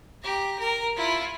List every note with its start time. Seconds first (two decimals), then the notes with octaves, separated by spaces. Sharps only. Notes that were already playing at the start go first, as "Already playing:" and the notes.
0.23 G4 A#5
0.59 A#4
0.96 E4 F4